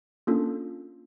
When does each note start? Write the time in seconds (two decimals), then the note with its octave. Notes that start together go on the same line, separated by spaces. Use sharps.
0.27 A#3 C#4 D4 F4 A4